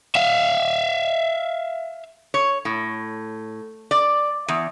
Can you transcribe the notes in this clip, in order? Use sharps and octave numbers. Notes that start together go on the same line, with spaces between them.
E5 F5
C#5
A2
D5
E2